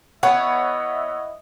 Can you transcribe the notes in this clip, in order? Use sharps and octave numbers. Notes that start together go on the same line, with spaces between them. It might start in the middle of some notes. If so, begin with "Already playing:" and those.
B3 E4 C#5 D#5 E5 F#5